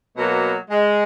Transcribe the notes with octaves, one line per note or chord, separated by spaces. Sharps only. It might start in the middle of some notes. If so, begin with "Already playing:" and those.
B2 F#3 A#3
G#3